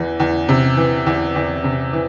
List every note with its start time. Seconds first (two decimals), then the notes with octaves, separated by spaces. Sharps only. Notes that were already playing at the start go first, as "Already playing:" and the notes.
Already playing: E2 E3
0.20 E2
0.49 C3
0.77 E3
1.06 E2
1.36 E2
1.64 C3
1.93 E3